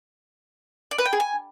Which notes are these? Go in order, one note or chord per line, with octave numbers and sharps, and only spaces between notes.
D5
B4
G5
G#4
G#5